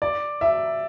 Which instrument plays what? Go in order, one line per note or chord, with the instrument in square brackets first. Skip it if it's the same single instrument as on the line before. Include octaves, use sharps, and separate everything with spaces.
[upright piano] D5
E5